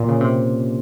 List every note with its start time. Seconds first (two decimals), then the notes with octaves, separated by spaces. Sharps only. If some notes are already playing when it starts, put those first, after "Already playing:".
Already playing: A#2
0.08 C#3
0.21 C3